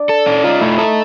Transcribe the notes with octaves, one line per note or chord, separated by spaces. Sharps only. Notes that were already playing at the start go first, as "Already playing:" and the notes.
Already playing: D4 D5
A4
C#4
D#4 F4 D#5
A3 E4 E5
D#4 A4 D#5